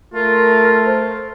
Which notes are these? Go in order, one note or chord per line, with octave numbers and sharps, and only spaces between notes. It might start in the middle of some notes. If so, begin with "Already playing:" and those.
A3 F4 A#4
C5